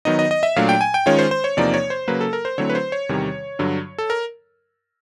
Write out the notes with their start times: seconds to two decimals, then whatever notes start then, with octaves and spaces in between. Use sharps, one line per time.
0.05 D#3 F#3 B3 D#4 D#5
0.19 D#5
0.31 D#5
0.43 E5
0.56 A#2 F#3 A3 D4 F5
0.69 G5
0.81 G#5
0.94 G5
1.06 D#3 G#3 C#4 F4 C#5
1.19 C5
1.31 C5
1.44 C#5
1.57 E2 C3 F3 A#3 D#4 D5
1.74 C#5
1.90 C5
2.08 C#3 F#3 A#3 B4
2.21 A4
2.33 A#4
2.45 C5
2.58 D3 F#3 A3 C4 E4 C#5
2.70 B4
2.75 C5
2.92 C#5
3.09 E2 C3 D#3 G3
3.59 G2 D3 F#3
3.98 A4
4.10 A#4